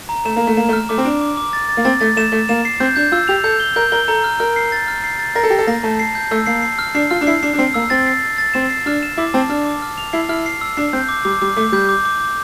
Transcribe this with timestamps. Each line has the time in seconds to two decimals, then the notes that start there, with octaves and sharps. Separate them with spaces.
0.09 A#5
0.25 A3 E7
0.36 A#3 E7
0.47 A3
0.57 A#3 E7
0.69 A3
0.73 F6
0.89 A3 D6
0.98 C4
1.05 D4 D7
1.21 D6
1.37 D6
1.53 A6
1.69 A6
1.77 A#3
1.85 C4 A6
2.01 A3 A6
2.17 A3 E7
2.32 A3 E7
2.49 A#3 E7
2.65 C7
2.80 C4 G6
2.96 D4 G6
3.12 F4 E6
3.28 G4 F7
3.44 A4 G6
3.60 G7
3.76 A#4 G6
3.92 A#4 G7
4.08 A4 A#5
4.24 F6
4.40 A#4 F6
4.56 C7
4.72 A6
4.88 F6
5.04 C7
5.19 A6
5.35 A#4 A#6
5.43 A4
5.50 G4 A#6
5.59 A4
5.67 A#3 A#6
5.83 A3 A5
5.99 C7
6.15 G6
6.31 A3 E6
6.46 A#3 C7
6.62 C7
6.79 F6
6.95 D4 C7
7.10 F4 F6
7.21 D4
7.27 E4 C7
7.42 D4 C7
7.53 D4
7.58 C4 C7
7.74 A#3 E6
7.90 C4 A6
8.07 C7
8.23 A6
8.38 A6
8.54 C4 E7
8.70 C7
8.86 D4 F6
9.03 E7
9.17 E4 D6
9.34 C4 A5
9.49 D4 F6
9.66 D6
9.82 F6
9.98 F7
10.13 E4 C7
10.29 E4 F6
10.46 C7
10.61 E6
10.77 D4 C7
10.93 C4 G6
11.09 D6
11.25 G3 D6
11.42 G3 D6
11.57 A3 D6
11.72 G3 G6
11.89 D6
12.05 D6
12.21 D6